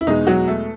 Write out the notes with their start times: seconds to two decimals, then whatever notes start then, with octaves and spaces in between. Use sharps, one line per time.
0.01 E4
0.07 E2 B2 G#3 B3 D#4
0.27 F#3 F#4
0.47 A3 A4